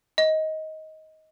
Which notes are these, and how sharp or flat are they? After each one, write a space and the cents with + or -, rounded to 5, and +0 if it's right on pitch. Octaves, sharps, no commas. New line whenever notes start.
D#5 +15